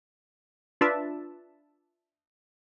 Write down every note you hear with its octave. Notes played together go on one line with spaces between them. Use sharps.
D4 F4 B4 D5 E5 A5